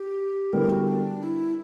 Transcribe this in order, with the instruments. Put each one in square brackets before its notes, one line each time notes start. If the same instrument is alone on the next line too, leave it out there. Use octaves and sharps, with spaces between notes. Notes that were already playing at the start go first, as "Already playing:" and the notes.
Already playing: [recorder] G4
[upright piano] D3 G3 B3 E4 B4 [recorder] A#4
[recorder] F#4
D4
E4